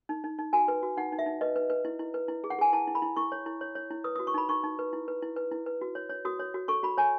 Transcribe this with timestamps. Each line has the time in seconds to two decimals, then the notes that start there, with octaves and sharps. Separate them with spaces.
0.09 D#4
0.24 D#4
0.38 D#4
0.53 F#4 G#5
0.68 B4
0.83 F#4
0.97 D#4 F#5
1.12 D#4
1.19 E5
1.26 D#4
1.41 B4 D#5
1.56 B4
1.70 B4
1.85 E4
1.99 E4
2.14 B4
2.28 E4
2.44 G#4
2.50 F#5
2.59 G#4 G#5
2.73 E4 A5
2.88 E4
2.95 B5
3.02 E4
3.16 E4 C#6
3.32 C#5
3.46 E4
3.61 C#5
3.75 C#5
3.91 E4
4.04 B4 D#6
4.16 F#4 D#6
4.27 C#6
4.34 D#4 B5
4.49 D#4 C#6
4.64 D#4
4.79 B4
4.93 E4
5.08 B4
5.22 E4
5.36 B4
5.52 E4
5.66 B4
5.81 F#4
5.95 C#5
6.10 C#5
6.25 F#4 D#6
6.39 C#5
6.54 F#4
6.68 A4 C#6
6.83 F#4 B5
6.98 C#5 G#5